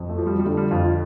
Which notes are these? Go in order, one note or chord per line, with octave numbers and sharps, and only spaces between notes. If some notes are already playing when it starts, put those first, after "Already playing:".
Already playing: F2
A3
F3
G3
G3
D3 A3
G3
F2 F4
F4